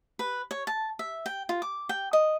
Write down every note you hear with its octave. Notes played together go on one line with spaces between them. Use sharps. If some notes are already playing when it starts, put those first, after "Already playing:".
B4
C#5
A5
E5
G5
F4
D6
G5
D#5